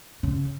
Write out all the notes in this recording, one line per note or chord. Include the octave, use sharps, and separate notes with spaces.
C#3